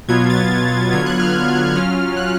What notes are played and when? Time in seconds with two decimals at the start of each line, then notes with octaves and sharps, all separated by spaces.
0.08 B2 F#3 B3 F4 G#6
0.30 A6
0.92 D3 F#3 B3 F4 G#6
1.06 F#6
1.20 F6
1.76 F#3 C#4 F4 F6
2.17 F#6